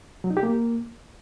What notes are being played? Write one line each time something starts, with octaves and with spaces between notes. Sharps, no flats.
F#3
D#4
G4
A#3